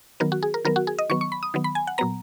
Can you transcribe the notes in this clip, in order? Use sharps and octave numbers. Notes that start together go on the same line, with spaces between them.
D#3 F#3 B3 A#4
F#4
G#4
A#4
D#3 F#3 B3 A#4
F#4
G#4
D#5
D#3 F#3 B3 C#6
C#6
B5
D#6
D#3 F#3 B3
B5
G#5
F#5
A#2 F#3 B3 A#5